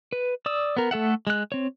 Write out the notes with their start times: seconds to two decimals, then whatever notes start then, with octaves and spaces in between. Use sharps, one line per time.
0.13 B4
0.46 D5 D#6 E6
0.77 B3 A#4
0.91 A3 A4 E5 F#5
1.27 G#3 F#6
1.52 C4 C#5